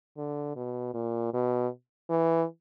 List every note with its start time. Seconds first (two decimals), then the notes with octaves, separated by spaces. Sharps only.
0.17 D3
0.56 B2
0.94 A#2
1.33 B2
2.10 E3